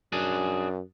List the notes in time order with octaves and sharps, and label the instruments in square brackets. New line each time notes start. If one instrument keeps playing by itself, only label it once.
[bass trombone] F#2 [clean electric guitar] D4 F#4 G#4